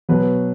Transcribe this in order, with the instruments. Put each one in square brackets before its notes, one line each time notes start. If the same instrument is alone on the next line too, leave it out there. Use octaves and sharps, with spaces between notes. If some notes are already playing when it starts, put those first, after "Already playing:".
[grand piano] B2 F#3 B4